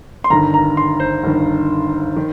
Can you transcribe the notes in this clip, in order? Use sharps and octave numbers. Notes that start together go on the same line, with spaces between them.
C6
G1 G2 D#3 A#5
A#5
C6
C5
G1 G2 D#3
D#3